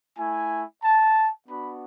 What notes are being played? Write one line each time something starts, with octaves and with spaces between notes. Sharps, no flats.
A3 E4 G#5
A5
B3 D4 F#4 B5